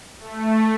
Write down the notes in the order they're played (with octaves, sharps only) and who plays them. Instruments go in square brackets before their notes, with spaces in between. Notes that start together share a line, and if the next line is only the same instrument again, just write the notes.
[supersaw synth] A3